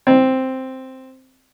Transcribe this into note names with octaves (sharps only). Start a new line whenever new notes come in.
C4